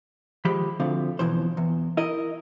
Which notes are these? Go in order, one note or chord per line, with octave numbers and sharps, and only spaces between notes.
D#3 F3 G#3 G4 B5
D2 D3 F3 C4 F5
F2 B2 E3 C5
E2
E4 A#4 D#5